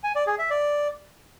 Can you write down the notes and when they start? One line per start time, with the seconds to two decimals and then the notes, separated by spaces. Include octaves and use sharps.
0.04 G#5
0.15 D5
0.27 G#4
0.39 E5
0.50 D5